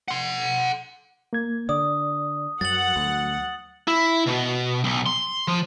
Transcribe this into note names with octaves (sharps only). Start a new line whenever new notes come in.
F#5 C6
A#3 G#6
D3 D5 D#6
F#2 F#3 F#5 A6 F#7
D2
E4
B2
B1
C6
F3